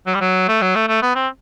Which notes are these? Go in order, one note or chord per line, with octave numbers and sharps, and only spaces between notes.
F#3
G3
F#3
A3
F#3
A3
A3
B3
C4